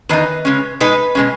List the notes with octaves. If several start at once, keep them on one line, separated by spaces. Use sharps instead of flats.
E2 D#3 D#4 B4
C#3 G#3 C#4
B2 G#3 D#4 B4
B2 G#3 C#4